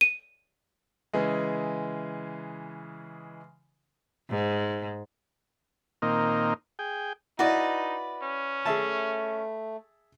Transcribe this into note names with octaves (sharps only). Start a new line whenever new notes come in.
D#7
C#3 E3 G#3
G#2
A#2 D#3 A#3 C4 D#4
G#4 G5
D#4 E4 F#4 B4 D5 D#5
C#4
A3 G#4 E5 A5